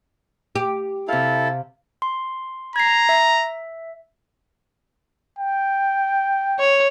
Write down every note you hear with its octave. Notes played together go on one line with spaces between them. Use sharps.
G4
C3 E4 A4 F5
C6
A#5 G#6 C7
E5
G5
C#5